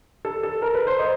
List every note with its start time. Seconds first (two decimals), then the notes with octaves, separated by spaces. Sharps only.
0.25 A4
0.43 A4
0.62 A#4
0.74 B4
0.87 C5
0.99 D#5